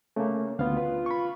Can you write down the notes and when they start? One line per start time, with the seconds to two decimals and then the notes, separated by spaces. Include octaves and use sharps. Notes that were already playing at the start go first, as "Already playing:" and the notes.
0.16 C#3 A3 A#3
0.59 D2 B3 F4
0.77 B4
1.06 B5 C#6